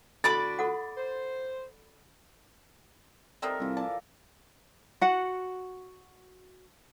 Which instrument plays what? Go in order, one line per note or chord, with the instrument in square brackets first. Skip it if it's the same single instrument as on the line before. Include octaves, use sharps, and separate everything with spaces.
[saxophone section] A2 D3 F#4 [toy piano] A4 [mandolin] D5 B5 D6 [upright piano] A6
[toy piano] F4 A4 F#5
[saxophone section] C5
[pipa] G3 C4 D#4 [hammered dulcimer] A4 A#4 E5
[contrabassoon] C2 [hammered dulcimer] E3 F3
[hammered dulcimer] D5 F5 [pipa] A5
[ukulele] F#4 F#5